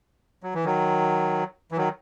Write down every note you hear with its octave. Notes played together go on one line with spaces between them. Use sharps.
F#3
E3
D#3 F#3
E3
D#3 F#3